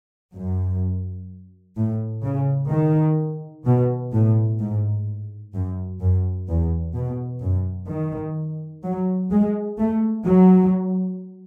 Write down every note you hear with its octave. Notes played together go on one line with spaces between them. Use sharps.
F#2
A2
C#3
D#3
B2
A2
G#2
F#2
F#2
E2
B2
F#2
D#3
F#3
G#3
A3
F#3